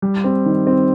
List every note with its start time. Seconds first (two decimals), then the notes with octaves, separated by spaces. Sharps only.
0.02 G3
0.24 C4
0.46 D#3
0.67 C4